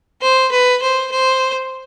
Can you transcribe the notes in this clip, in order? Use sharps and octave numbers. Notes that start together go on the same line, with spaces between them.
C5
B4
C5
C5